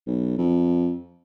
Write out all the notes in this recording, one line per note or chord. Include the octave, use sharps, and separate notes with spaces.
B1
F2